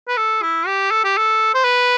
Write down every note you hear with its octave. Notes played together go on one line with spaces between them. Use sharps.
B4
A4
E4
G4
A4
G4
A4
C5
B4